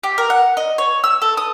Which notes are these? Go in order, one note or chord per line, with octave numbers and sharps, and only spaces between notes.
G4
A#4
F#5
D#5
C#5
E6
A4
D#6